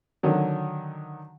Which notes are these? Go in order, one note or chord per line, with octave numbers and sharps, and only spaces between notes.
D3 D#3 F#3